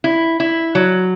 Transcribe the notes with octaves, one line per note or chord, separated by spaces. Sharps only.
E4
E4
F#3